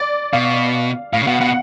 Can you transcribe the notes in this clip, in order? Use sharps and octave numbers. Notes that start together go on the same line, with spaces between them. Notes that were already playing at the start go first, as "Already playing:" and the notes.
Already playing: D5
B2 F5
A2 F5
C#3
B2 F#5
B2 F#5